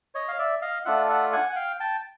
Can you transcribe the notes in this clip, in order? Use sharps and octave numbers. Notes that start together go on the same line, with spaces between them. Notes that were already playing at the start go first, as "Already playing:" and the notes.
C#5 D#5
F5
D5 E5
D#5 F5
A3 D4 F4 E5 F#5
E5 F#5
F#5 G#5
F#5
F5 G5
G5 A5